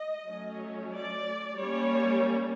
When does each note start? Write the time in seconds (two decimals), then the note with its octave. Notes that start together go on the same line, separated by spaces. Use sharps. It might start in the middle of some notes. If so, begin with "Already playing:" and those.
Already playing: D#5
0.27 F#3 A3 C#4
0.93 D5
1.59 G3 A#3 C#4 C#5